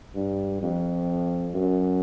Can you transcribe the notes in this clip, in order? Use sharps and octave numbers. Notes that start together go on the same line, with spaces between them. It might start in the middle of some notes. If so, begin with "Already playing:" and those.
G2
F2
F#2